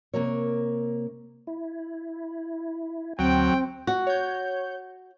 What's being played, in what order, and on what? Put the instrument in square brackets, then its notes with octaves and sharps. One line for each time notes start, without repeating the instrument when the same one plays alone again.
[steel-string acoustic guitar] C3 A#3 A#4 C#5
[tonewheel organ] E4
[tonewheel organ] D2 [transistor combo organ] F#3 [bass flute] C4 [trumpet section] G5
[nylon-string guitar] F#4
[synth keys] C#5 G6